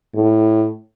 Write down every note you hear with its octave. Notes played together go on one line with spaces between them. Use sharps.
A2